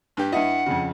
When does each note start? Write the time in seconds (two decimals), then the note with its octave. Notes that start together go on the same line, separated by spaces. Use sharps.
0.17 G2 G4
0.32 G2 E4 D#5 F#5
0.66 F2 C#3